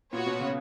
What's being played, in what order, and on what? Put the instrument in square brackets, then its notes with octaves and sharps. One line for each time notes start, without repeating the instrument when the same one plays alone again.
[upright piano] A#2 [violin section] B3 F#4 C#5
[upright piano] B2
C#3